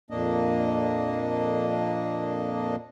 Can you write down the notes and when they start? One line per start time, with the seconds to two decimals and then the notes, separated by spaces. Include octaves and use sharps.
0.10 F2 A#2 A#3 D4 D#5